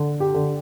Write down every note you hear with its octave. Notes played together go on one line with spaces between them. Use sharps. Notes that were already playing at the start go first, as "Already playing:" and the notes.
Already playing: D3
G4
D3